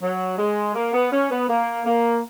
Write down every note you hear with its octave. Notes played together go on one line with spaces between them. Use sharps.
F#3
G#3
A#3
B3
C#4
B3
A#3
A#3